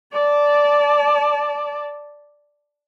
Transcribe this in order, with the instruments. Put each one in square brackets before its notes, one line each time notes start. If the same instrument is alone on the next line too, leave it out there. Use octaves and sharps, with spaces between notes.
[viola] D5 A5